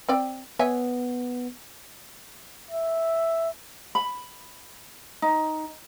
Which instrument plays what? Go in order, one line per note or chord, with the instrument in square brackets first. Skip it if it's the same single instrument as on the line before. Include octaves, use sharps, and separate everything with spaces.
[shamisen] C4 D5 G5
[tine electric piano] B3 [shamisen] C#5 E5 G#5
[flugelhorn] E5
[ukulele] B5
D#4